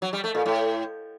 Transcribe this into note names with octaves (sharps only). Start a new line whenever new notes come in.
F#3
G3
A3
A#2
A2